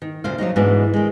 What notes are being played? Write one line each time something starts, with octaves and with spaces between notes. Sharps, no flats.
D#3
D2 A#2 C5 F5
F3 F#3 G#3 D#4
G#2 B2 E3 G#3 D4
D#3 G#3